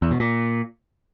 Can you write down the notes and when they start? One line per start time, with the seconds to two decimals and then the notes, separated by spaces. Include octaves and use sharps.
0.02 E2
0.11 B2
0.20 A#2